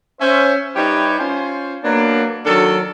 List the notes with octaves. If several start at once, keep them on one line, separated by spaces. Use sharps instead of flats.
C#4 C5 E5
G3 D#4 E4 G4 B4 C#5
C#4 F4 C5
F#3 A#3 B3 D4
D#3 F#3 D4 A4